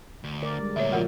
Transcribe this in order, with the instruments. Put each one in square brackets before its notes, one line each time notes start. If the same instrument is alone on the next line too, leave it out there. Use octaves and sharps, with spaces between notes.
[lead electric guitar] D2
[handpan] D3 A#4 D5
G3 G#3
[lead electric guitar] D2 A#2 [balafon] C#5 E5
[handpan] F3 F#3 F#4 [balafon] F4 A#4 F#5